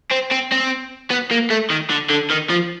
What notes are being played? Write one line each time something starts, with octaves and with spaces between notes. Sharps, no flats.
C4
C4
C4
B3
A#3
A3
D#3
D3
D3
D#3
F3